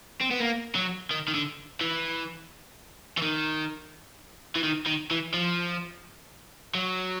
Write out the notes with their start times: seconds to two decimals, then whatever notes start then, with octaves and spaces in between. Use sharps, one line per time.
0.21 C4
0.31 B3
0.40 A#3
0.75 F#3
1.11 D#3
1.28 D#3
1.34 D3
1.81 E3
3.18 E3
3.22 D#3
4.56 E3
4.63 D#3
4.86 D#3
5.11 E3
5.34 F3
6.75 F#3